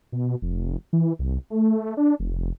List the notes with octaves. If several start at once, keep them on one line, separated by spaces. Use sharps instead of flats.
B2
F1
E3
C2
A3
D4
F1